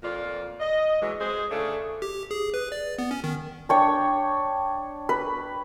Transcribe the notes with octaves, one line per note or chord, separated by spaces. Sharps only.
F2 A#2 F4 D5
D#5
E3 F#3 G#3
G#3 G#4 C5
C#3 A3 D4 F4 G#4 A4
G4
G#4
B4
D5
B3
C#4
D#3
D4 C#5 G5
B4